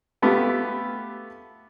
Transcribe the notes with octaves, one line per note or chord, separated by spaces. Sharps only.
A3 B3 F4 G4